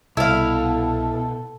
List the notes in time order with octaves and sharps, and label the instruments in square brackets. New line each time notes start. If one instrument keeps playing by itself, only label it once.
[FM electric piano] C2 [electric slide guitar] B2 [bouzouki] E4 F5 [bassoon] A4